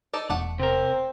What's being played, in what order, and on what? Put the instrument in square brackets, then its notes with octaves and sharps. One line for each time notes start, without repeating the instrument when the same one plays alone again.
[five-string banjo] D#4 A4 D5
[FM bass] E1 [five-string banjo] A3 D5 F#5
[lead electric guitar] C3 A#4 [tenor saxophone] C4